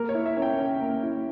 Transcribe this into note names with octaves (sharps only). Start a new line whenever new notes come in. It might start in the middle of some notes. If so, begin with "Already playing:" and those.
Already playing: A#3 A#4
C#5
E4
E5
C#4
G5
C#4
A#3
E4